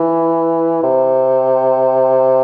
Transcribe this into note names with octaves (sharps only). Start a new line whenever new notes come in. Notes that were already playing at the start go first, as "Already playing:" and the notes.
Already playing: E3
C3